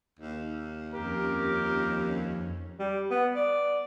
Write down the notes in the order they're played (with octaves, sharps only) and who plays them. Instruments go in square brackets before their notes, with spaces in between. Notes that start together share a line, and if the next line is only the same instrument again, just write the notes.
[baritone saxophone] D#2
[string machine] F2 C#4 [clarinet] G4 [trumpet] A#4
[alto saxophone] G3
B3
D5